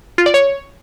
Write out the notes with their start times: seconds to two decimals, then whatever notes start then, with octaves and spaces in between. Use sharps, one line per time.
0.18 F4
0.26 D5
0.34 C#5